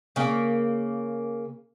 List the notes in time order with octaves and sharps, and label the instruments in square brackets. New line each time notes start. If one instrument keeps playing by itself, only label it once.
[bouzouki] C#3 A#3